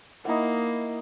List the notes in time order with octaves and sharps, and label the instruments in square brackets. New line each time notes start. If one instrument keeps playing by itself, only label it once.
[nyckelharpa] A#3 [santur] D#4 E4 F#5